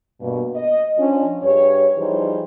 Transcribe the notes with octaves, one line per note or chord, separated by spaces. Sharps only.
G2 B2 A#3
D#5
F3 C#4 D4
G2 G4 G#4 C#5
E3 F3 G3 D#4 G#4 C5